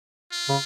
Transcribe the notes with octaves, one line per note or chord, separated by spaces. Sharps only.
F4
C#3